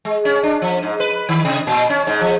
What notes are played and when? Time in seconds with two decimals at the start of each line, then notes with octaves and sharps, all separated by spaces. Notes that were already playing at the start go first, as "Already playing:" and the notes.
0.05 G#3
0.25 C#4
0.43 D4
0.62 F3
0.82 G#2
1.00 B4
1.29 D#3
1.45 C3
1.67 A#2
1.90 C#4
2.07 G#2
2.21 F3